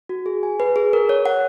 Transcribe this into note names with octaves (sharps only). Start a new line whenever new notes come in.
F#4
G#4
G#5
B4
G#4
A#4
C#5
F#5